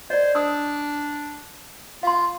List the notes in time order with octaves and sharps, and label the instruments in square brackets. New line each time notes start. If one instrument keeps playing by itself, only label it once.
[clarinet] C5 [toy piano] D5 D#5
[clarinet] D4 [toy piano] D#6 E6
[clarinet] F4 [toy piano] F5 C6